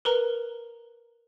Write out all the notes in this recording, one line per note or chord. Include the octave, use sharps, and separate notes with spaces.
A#4 B4 A#5